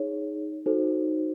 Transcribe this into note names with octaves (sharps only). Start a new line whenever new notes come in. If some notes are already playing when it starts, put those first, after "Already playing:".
Already playing: D#4 G#4 C#5
D#4 F#4 A4 C5